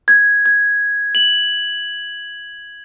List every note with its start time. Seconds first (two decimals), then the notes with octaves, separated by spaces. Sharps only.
0.08 G#6
0.46 G#6
1.15 F#7